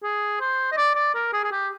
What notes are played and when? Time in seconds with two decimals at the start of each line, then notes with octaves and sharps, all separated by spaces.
0.03 G#4
0.41 C5
0.72 D#5
0.77 D5
0.95 D5
1.14 A#4
1.33 G#4
1.44 G#4
1.52 G4